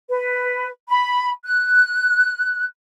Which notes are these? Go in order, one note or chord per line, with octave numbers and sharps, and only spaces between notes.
B4
B5
F#6